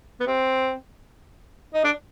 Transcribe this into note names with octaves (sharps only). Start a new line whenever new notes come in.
B3
C4
D#4
D4